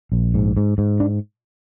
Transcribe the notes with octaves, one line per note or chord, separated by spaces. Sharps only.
A#1
G#2
G#2
G#2
D4